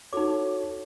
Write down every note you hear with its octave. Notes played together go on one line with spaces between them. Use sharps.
D#4 F#4 A4 C#5 D6